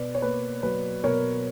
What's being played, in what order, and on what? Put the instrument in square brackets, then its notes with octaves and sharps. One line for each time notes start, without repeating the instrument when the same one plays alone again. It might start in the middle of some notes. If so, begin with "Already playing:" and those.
Already playing: [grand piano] B2 B4 D5
C#5
A#3 B4
F#3 B4
B2 A#4 C#5